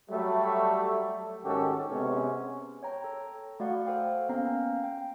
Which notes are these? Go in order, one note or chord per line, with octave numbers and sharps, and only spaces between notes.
F#3 G3 A3
G#2 D#3 C#4 F#4 G4 A4
C3 G#3 B3 C#4
C#5 G5 A#5
A4
A3 F#4 D5 F5 F#5
A4 C5 F5 G5
A#3 B3 C#4 F5 G5 A#5
G5